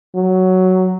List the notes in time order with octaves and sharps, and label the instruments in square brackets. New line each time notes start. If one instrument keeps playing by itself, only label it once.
[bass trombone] F#3